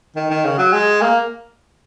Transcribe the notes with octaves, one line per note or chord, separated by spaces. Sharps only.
D#3
D#3
C#3
F#3
G#3
A#3